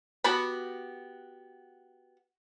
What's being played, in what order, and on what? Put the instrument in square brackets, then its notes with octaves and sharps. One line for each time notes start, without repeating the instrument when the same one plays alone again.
[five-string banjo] B3 F#4 G4 A5 B5